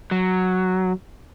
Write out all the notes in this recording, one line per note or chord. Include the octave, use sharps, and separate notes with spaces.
F#3